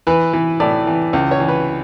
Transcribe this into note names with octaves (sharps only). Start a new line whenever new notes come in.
E3 B4
E3
A2 D5
E3
C#2
C#5
E3
B4